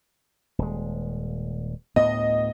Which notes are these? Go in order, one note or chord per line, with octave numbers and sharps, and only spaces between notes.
D#1 G#3
D2 A2 B3 D#5